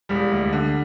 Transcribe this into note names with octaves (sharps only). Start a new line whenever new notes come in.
E1 G3
D2
D3